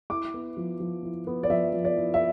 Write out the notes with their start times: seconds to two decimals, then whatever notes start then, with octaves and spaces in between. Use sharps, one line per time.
0.10 E4 D6
0.34 B3
0.57 F3
0.80 F3
1.03 E4
1.27 B3
1.43 D5
1.50 F3 E5
1.73 F3
1.85 D5
1.96 E4
2.14 E5